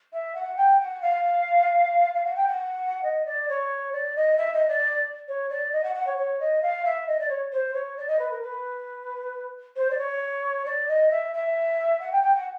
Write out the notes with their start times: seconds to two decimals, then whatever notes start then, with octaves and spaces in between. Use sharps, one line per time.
0.13 E5
0.35 F#5
0.57 G5
0.80 F#5
1.02 F5
2.15 F5
2.25 F#5
2.36 G5
2.48 F#5
3.03 D#5
3.26 D5
3.49 C#5
3.93 D5
4.16 D#5
4.38 E5
4.54 D#5
4.68 D5
5.28 C#5
5.50 D5
5.73 D#5
5.84 F#5
5.95 F#5
6.07 C#5
6.18 C#5
6.40 D#5
6.62 F5
6.85 E5
7.07 D#5
7.19 D5
7.29 C#5
7.52 C5
7.74 C#5
7.97 D5
8.08 D#5
8.19 B4
8.31 A#4
8.42 B4
9.76 C5
9.90 D5
9.98 C#5
10.66 D5
10.89 D#5
11.11 E5
11.34 E5
12.00 F#5
12.12 G5
12.23 G5
12.35 F#5